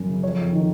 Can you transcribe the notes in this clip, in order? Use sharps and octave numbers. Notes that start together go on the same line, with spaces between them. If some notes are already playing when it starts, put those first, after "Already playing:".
Already playing: F#2 C#4
C#3
F2 C#5
F2
D#3